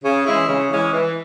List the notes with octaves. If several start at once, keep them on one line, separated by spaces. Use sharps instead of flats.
C#3
E3 G#3 C#4 E4
C#3
E3 G#3 C#4 E4
E3